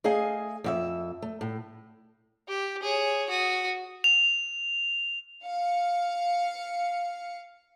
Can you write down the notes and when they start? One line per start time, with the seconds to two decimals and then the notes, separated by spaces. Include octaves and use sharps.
0.04 A3 G#4 D#5 F5 G#5
0.64 F2 F4 E5
1.22 A3
1.41 A2
2.47 G4
2.83 G#4 C#5
3.29 F#4 D#6
4.04 F7
5.44 F5 C#7